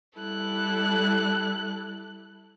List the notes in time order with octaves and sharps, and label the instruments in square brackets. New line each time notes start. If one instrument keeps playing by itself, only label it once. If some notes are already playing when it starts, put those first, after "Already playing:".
[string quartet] G3 E4 A4 F#6